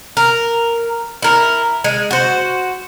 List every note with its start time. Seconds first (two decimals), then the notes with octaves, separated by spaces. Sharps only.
0.17 A#4
1.22 E4 A#4
1.84 G#3
2.11 F#4 C5